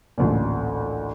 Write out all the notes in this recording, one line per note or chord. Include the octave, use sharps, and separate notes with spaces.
A1 D2 A#2